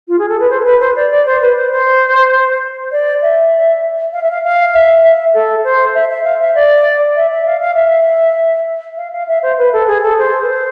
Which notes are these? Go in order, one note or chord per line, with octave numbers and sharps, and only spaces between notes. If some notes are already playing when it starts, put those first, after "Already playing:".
F4
G#4
A4
B4
C5
A4
B4
C5
D5
D5
C5
B4
C5
C5
D5
E5
F5
E5
F5
F5
E5
E5
A4
C5
E5
E5
F5
E5
D5
E5
E5
F5
F5
E5
F5
F5
E5
C5
B4
A4
G#4
A4
C5
B4
C5